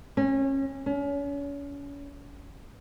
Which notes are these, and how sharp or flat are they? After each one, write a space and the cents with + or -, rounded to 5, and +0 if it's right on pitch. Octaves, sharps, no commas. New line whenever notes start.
C#4 -25
C#4 +35